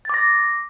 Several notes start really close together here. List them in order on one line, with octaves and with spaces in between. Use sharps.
A6 D6 A#6